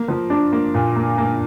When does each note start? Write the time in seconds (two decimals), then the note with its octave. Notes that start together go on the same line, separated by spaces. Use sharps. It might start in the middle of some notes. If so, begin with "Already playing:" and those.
Already playing: A#3
0.08 F3
0.30 D4
0.52 A#3
0.74 A#2
0.96 A#3
1.18 A#3